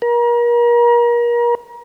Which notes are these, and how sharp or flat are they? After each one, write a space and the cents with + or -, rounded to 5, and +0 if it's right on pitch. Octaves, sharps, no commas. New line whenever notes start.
A#4 +35